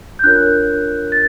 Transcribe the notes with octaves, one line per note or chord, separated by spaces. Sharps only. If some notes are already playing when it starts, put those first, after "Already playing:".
G6
D4 F4 A#4 C#5 F#6
A6